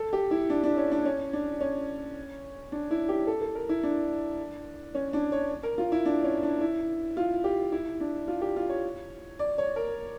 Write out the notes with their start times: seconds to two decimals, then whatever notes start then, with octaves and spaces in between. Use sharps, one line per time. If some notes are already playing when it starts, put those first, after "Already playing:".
Already playing: A4
0.13 G4
0.31 E4
0.50 D4
0.64 D4
0.77 C#4
0.92 D4
1.05 C#4
1.33 D4
1.61 C#4
2.72 D4
2.91 E4
3.09 G4
3.27 A4
3.42 A4
3.55 A#4
3.69 E4
3.83 D4
4.95 C#4
5.13 D4
5.32 C#5
5.63 A#4
5.78 F4
5.92 E4
6.06 D4
6.24 C#4
6.43 D4
6.61 E4
7.17 F4
7.44 G4
7.72 E4
8.00 D4
8.28 F4
8.41 G4
8.56 F4
8.70 C#5
9.39 D5
9.58 C#5
9.76 A#4